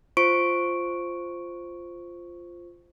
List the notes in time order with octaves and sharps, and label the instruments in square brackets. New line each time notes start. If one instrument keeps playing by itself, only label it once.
[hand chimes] F4 C5 C#6 D7